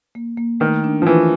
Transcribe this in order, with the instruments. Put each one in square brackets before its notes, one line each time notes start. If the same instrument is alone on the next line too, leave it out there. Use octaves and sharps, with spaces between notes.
[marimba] A#3
A#3
[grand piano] D#3 [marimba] A3
[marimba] D4
[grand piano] F3
[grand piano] E3 [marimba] D4